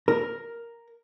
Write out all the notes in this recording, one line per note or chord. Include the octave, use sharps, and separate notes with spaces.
A#4